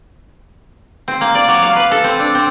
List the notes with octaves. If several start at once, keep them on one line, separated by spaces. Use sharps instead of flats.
C4
A#3
D5
F#3
F5
B4
A4
C4
D4
C4